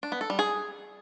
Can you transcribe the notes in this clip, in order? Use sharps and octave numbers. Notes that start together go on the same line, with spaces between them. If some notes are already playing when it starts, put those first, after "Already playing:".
D4
B3
A4
G3
G#4